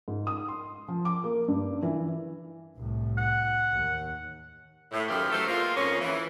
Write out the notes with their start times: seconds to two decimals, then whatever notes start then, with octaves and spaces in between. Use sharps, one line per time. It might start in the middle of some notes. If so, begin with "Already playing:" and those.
0.08 G#2
0.27 D#6
0.48 C6
0.88 F3
1.05 D6
1.24 A#3
1.48 G2
1.83 E3
2.77 C2 A2
3.18 F#5
3.73 D#2
4.92 A2
5.09 F#2 D#3 E3 G4 F5
5.31 F#3 A3 G4 A4 C5
5.47 G#3 A#3 B3 F4
5.76 F2 G#2 A#3 C#4
6.00 E3